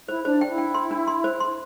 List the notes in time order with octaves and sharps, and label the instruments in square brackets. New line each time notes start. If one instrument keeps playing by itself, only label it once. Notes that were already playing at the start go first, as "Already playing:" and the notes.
[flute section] E4 [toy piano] C5
[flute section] D4 [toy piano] C5
[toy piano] G5
[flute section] E4
[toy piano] G5
C6
D4
C6
C5
C6